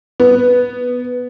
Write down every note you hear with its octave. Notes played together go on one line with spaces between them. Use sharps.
B3